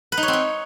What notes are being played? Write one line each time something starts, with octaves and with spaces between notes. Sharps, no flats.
B4
D#4
C#5
C4
C#5